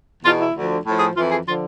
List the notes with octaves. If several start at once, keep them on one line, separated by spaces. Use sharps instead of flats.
E2 B2 F4
E4
D2 D3 F3
A2 F3
G#4
F2 E3 F4
G#4
D3 F3 F4